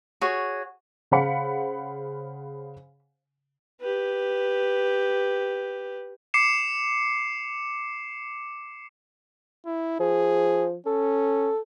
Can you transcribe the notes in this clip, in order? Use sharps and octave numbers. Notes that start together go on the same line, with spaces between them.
F#4 G#4 C#5
C#3 C5 F5 F#5 B5 C#7
G4 B4
D6 C7 C#7 E7
E4
F3 G#4
C#4 A4